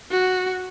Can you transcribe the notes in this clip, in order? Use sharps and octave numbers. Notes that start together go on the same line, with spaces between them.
F#4